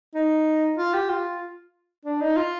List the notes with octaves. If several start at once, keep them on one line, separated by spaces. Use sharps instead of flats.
D#4
F4
G4
F4
D4
D#4
F4